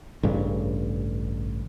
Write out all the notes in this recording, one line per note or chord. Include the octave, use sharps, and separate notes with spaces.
A1 G2 C#3